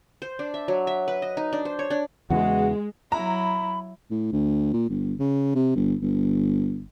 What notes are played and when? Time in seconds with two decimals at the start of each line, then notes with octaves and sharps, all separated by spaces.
0.22 C5
0.39 D4
0.54 E5
0.68 F#3
0.87 E5
1.08 B4
1.22 D#5
1.37 D#4
1.53 D4
1.65 C5
1.79 C#5
1.90 D4
2.30 E2 C#3 E3 G#3 F#4
3.12 F#3 E4 A#5 B5
4.10 A2
4.32 D2
4.73 A#2
4.89 G1
5.20 C#3
5.55 C3
5.75 G1
6.02 G1